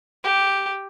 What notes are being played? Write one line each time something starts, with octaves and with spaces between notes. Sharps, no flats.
G4